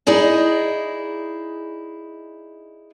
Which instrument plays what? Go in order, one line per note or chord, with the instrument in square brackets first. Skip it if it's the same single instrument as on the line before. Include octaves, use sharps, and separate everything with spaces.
[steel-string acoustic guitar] D#4 E4 G#4 D5 D#5